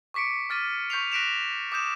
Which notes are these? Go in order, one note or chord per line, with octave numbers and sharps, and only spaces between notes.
C#6 D6 B6 C#7 D7
D6 F6 A6 B6 D#7
C#6 G6 B6 C7 F7
F#6 A#6 B6 D7 E7 F7
D6 D#6 G6 E7